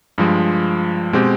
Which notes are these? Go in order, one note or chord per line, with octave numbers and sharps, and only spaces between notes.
G2 F3 G#3
B2 G#3 C4 G4